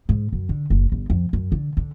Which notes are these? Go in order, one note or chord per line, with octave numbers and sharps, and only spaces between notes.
G#2
F#2
D3
F#1
G1
F2
F#2
D3
D3